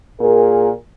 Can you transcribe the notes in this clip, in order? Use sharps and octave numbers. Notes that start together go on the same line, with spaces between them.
A#2 G#4 A#4